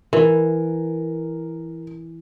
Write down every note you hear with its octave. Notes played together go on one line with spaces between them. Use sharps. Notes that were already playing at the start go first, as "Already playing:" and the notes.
E3 A#4